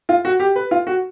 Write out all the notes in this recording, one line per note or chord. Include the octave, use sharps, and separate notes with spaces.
F4
F#4
G4
B4
F4
F#4